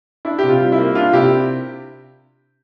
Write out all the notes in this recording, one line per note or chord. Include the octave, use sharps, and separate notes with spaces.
D4 E4
C3 G4
F4
G3
E4
A#3
D4 F4
C3 E4 G4